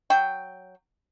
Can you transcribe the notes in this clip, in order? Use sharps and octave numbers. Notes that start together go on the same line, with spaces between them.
F#3 G5